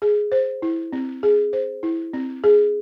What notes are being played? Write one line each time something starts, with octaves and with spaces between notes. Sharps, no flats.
G#4
C5
E4
C4
G#4
C5
E4
C4
G#4